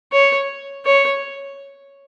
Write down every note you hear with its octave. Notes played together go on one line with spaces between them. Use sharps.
C#5
C#5